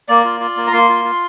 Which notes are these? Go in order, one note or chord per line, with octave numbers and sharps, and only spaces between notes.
A#3 D5
F4
F4
A#3
A#5
A#3 C6
F4
F4